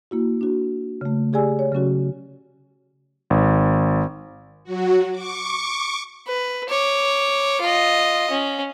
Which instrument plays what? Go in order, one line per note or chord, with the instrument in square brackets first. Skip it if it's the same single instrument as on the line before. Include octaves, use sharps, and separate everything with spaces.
[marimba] A#3 E4 F#4
D4 F#4
C#3 A3
G4 G#4 D5 G#5 E6
C#5
C#3 F#3 C#4 F#4
[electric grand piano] G#1
[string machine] F#3 F#4
C#6 D6
[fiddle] B4
C#5 D6
F4 D#5
C#4